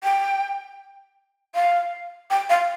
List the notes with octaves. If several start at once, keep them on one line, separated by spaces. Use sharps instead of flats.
G5
F5
G5
F5